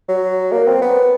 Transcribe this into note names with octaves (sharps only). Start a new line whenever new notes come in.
F#3
A#3
C4
B3